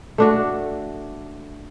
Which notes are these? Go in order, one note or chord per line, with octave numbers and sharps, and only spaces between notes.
A3 D4 F#4